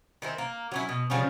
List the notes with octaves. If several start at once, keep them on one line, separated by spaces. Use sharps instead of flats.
D#3 E3 C4
A#3
F#3 C#4 E4
B2
C#3 F3 G3 C#4